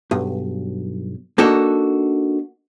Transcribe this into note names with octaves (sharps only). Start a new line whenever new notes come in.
B1 G2
A#3 D4 D#4 F#4 A4